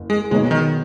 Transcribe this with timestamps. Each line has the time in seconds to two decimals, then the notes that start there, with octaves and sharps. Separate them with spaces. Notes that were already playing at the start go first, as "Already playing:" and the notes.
Already playing: F#1
0.10 G#3
0.31 B1 B2 G#3 B3 G#4 C#5
0.51 D#3